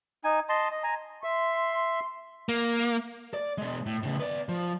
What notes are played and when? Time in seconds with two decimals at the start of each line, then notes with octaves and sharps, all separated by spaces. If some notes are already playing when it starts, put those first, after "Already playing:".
0.24 D#4 G#5
0.49 D#5 A5 C6
0.72 D#5
0.83 G#5 A#5
1.24 E5 C6
2.49 A#3
3.34 D5
3.58 B2 G#3
3.86 A2
4.03 A2 C#3
4.20 B3 D5
4.49 F3